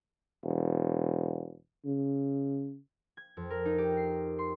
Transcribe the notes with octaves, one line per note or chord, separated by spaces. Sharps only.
E1
C#3
G#6
F2
A#4
D#4
G4
C7
C6